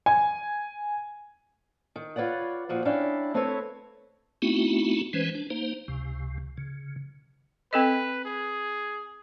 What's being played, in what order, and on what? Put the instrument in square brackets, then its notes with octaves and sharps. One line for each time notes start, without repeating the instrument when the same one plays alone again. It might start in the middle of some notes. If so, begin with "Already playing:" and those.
[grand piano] G#5
[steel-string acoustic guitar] D#3
F4 B4 C#5 D5 F#5
A#2 F3 F#4 C5
C#4 D4 E4 F5 G5
A3 C4 E4 A4 B4 C#5
[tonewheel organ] A3 B3 C4 D#4 E4 F#4
E3 G#3 C#4 B4 C5
D4
A#3 D#4 C5
C#2 C3
C#3
[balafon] C4 A4 D#5 [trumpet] B4
[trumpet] G#4